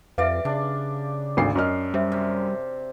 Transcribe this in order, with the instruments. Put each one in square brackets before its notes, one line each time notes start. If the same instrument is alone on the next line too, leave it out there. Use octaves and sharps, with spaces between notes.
[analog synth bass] F2 [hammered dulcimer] G4 D5 [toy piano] B4 E5 [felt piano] F5
[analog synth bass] C#3 [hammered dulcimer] D4
[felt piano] G#1 D2 C7
F#2 D#5 F6
[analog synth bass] G3 [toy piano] F#4 C5 E5
[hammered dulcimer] C3